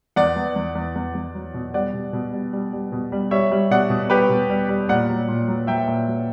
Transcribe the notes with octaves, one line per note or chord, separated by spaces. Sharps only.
E2 D5 F#5
E2
E2
E2
E2
E2
F#3
B2
G3 D5 F#5
B2
B2
G3
G3
G3
B2
G3
G3 C#5 E5
G3
B2 D5 F#5
B2
G3 G4 B4
B2
G3
G3
A#2 D5 F#5
F#3
A#2
F#3
F#3 E5 G5
A#2
F#3